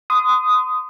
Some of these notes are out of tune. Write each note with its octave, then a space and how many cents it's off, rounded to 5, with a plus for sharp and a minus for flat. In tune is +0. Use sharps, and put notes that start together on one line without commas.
C6 -35 D#6 +0